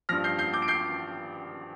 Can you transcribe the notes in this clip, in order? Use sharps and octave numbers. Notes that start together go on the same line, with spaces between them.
G2 F3 F6 A#6
G6 C7
G6 C7
D6 G6
D7
G6 C7